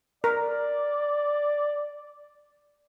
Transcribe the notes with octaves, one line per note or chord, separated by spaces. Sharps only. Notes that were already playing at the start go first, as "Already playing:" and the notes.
A#4 D5